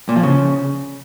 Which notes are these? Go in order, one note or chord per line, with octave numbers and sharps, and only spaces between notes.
A#2
F3
C#3